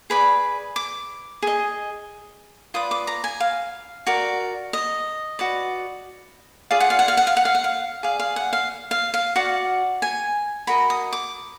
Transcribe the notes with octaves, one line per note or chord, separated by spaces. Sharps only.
G#4 B4 D5 B5
D6
G#4 D#5
F4 B4 D5 D#6
D6
A#5
G#5
F5
F#4 A#4 D5
D#5
F#4 B4 D5
F4 G#4 D5 F5
F#5
F5
F#5
F5
F#5
F5
F#5
F5
F#5
F5
G#4 D5 F5
F5
F#5
F5
F5
F5
F#4 D5 F#5
G#5
F#4 A#4 D#5 B5
D#6
D6